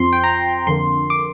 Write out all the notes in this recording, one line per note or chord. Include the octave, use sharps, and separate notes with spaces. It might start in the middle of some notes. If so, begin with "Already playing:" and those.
Already playing: F2 F3 C4 C6
G5
A#5
F2 D3 A#3 C6
D6